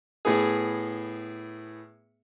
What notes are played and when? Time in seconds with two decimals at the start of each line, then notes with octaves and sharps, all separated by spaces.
0.25 A2 B3 G#4